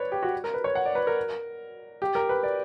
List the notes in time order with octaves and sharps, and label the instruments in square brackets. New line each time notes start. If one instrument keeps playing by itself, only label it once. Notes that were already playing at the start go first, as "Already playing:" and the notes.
Already playing: [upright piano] B4 C#5 D5
G4
F#4
A#4
B4
C#5
F#5
D5
B4
A#4
G4
A#4
B4
D5